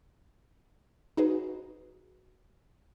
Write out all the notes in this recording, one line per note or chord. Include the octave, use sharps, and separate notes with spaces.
D#4 F#4 G#4 B4